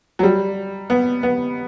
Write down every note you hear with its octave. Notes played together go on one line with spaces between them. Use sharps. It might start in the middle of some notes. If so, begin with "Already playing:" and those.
F#3
G3
B3
B3